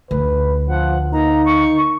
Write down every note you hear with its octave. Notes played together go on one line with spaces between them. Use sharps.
D2 B4
F3 F#5
A#3 D#4 A#5
C#6